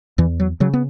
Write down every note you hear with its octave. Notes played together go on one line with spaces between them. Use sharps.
E2 E3
F#3
C#3 F#3
B3